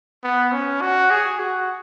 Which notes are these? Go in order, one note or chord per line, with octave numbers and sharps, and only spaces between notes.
B3
C#4
F#4
G#4
F#4